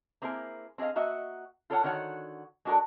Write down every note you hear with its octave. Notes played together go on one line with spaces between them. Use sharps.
A#3 C4 E4 G#4 A#4
C4 G#4 D5 D#5 F5
A#3 F#4 D#5 E5 F#5
F4 A4 A#4 C#5 D5 F#5
D3 D#3 F#4 C#5 F#5
G#3 D4 F#4 A4 A#4 D5